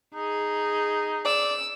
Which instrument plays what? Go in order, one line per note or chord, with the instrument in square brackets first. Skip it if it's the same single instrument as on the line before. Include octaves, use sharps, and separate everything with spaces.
[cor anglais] D#4 [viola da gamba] G#4
[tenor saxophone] D5 [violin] E6